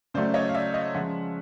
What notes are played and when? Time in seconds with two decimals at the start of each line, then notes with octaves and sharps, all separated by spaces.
0.14 C#3 F#3 A3 C5 D5
0.34 C#5 D#5
0.49 F5
0.54 D5 E5
0.74 D#5 F5
0.94 C#3 F3 G#3 E5 F#5